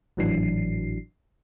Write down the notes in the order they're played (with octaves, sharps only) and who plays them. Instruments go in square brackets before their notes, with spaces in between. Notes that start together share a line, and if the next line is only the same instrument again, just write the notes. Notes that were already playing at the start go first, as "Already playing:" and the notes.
[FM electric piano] G#1 A2 E3 F#3 D4 C7